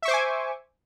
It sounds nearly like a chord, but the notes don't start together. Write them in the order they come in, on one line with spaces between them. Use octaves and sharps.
E5 C#6 C5 D6 G#5